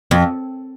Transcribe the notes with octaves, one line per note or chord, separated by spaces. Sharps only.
F2